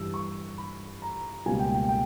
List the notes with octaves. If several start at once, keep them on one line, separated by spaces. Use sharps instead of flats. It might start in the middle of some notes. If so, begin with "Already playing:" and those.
Already playing: G2 E3 G3 E6
C#6
B5
A#5
C#2 B2 G3 A#3 G#5
G5
G5
G5